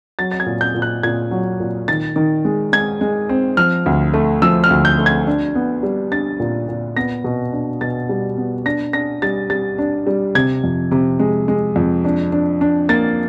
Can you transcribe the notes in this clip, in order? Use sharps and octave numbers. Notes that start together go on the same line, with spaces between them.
F#3 A6
A6
G#6
A#2
G6
A#2
F#6
A#2 G#6
F#3
A#2
D#3 A6
D#3
G#3
G#3 G#6
G#3
C4
F3 F6
D2
A3
F3 E6
F6
D2
G6
A3
G#6
D4
B3
G3
D4 A6
A#2
A#2
B3 A#6
B2
D4
B2 A6
G3
B3
D4 A#6
D4 A#6
G3 A6
G3 A6
D4
G3
C3 G#6
F2
C3
G#3
G#3
F2
D4
D4
D4
A#3 A6